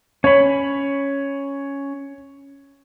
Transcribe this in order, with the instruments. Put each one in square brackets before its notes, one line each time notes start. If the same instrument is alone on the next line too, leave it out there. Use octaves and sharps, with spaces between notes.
[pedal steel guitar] C#4 B5 [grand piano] C#5